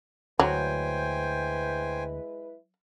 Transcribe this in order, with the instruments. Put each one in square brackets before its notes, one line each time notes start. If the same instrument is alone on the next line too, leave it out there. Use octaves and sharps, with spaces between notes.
[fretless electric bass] D2 [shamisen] F#3 [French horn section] G#3 E4 B4 [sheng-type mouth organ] C5 G5 G#5